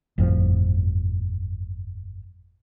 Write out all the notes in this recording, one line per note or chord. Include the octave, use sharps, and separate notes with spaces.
G1 F2 A2 F3